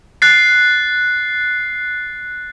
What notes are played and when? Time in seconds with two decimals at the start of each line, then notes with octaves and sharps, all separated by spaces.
0.22 F#6 A6 C7